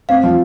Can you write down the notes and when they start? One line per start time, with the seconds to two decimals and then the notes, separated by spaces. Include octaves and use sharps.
0.09 C4 F5
0.23 F3